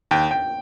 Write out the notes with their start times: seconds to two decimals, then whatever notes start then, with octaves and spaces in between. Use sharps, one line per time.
0.11 D#2 G5
0.31 G5